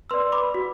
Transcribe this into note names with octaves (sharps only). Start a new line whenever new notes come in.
B4 D5 C6 E6
B5 D6
F#4